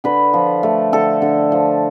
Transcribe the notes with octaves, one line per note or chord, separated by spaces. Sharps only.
D3 B4
F3
A3
D3 A4
D3
F3